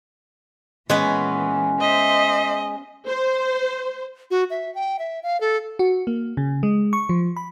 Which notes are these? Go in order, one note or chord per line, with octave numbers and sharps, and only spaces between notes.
A#2 E3 G#3 B3 C#4 B4
C5 D#5 E5
C5
F#4
E5
G5
E5
F5
A4
F#4
A#3
C#3
G#3
C#6
F3
B5